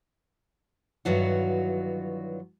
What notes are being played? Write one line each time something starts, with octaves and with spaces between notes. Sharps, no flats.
G2 D#3 E3 F#3 F4 F#4